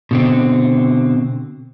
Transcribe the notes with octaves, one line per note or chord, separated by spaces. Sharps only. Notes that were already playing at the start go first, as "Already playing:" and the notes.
B2 D3 C4